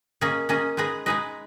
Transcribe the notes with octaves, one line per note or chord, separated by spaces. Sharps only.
A#3 C#4 G#4 D#5
A#3 C#4 G#4 D#5
G#3 D#4 G#4 B4 D#5
G#3 D#4 G#4 B4 D#5